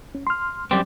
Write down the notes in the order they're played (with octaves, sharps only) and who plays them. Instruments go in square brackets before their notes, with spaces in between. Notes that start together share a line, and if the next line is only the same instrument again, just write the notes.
[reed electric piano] C#4
C6 F6
[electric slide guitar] F#2 G3 C4 [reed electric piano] D6